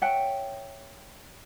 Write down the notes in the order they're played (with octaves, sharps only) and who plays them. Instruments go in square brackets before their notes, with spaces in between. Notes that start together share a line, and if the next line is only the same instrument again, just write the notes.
[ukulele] C#5 E5 F#5 G5